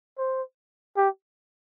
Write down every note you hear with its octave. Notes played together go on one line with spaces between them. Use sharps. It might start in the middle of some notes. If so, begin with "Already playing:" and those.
C5
G4